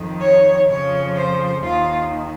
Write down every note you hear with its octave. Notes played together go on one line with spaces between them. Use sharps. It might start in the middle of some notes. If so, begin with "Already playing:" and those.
Already playing: F2 D#3
C#5
F2 C#3 F3 C#5
C5
D#2 D#3 F4